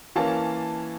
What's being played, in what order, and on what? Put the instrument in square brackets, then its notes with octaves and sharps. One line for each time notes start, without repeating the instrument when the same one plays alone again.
[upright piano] E3 A#3 C#4 F5 A5